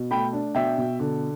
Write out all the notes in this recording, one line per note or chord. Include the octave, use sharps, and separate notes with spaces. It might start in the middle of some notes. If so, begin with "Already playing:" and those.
Already playing: B2
A3 G5 B5
D4
B2 E5 G5
B2
D3